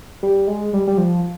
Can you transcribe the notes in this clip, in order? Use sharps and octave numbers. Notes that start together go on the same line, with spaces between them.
G3
G#3
G3
G3
F3